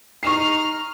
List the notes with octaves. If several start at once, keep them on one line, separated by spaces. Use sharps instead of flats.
D#4 C#6 F6 C7